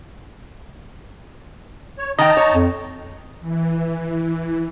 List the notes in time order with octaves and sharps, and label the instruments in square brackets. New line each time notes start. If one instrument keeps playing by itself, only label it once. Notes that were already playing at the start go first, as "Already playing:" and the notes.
[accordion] C#5
[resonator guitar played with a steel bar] D#3 G5 [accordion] D#4 A5 A#5 [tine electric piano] D#5
[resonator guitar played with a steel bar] C#5
[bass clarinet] F2
[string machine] E3